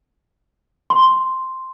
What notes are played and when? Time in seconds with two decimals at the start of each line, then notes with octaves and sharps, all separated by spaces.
0.90 C6